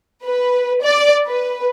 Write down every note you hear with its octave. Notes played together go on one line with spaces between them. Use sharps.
B4
D5
B4